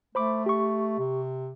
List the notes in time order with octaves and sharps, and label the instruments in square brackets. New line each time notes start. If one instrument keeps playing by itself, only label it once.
[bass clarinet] A3 [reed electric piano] C5 B5 D6
[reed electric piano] G4 C#6
[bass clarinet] C3